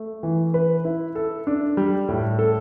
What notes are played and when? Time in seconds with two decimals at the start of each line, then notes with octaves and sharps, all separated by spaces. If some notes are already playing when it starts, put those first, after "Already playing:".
Already playing: A3
0.23 E3
0.54 B4
0.85 E4
1.15 A4
1.47 D4
1.77 G3
2.08 A2
2.39 A4